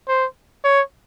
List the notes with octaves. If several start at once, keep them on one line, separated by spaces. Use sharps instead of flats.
C5
C#5